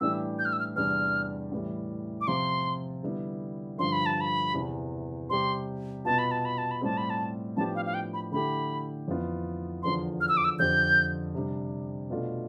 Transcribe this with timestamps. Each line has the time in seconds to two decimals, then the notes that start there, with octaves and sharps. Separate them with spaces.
0.01 A2 E3 G3 D4 G4 E6
0.39 G6
0.45 F6
0.53 E6
0.59 F6
0.76 E2 C3 G3 D4 F6
1.52 A2 E3 G3
2.21 D6
2.27 C3 F3 C4 F4 C6
3.03 D3 G3 B3 E4
3.78 G2 D3 F3 C6
3.92 B5
4.06 A5
4.21 B5
4.54 E2 C3 E3
5.30 C3 G3 C4 G4 C6
6.05 B2 B3 F4 A5
6.19 B5
6.31 A5
6.45 B5
6.58 A5
6.71 B5
6.81 A2 G3 C4 G4 A5
6.97 B5
7.10 A5
7.57 A2 F3 B3 D4 G4 A5
7.75 F5
7.86 F5
7.94 G5
8.13 B5
8.32 D3 A3 E4 G4 B5
9.08 F2 E3 B3 F4
9.83 E2 D3 F3 C6
10.21 F6
10.29 E6
10.37 D6
10.44 E6
10.59 F2 D3 F3 C4 G4 G6
11.35 C3 G3 D4
12.10 B2 A3 D4 F4